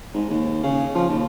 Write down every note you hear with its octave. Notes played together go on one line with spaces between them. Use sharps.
G#2
D#2
C#3
F3
D#2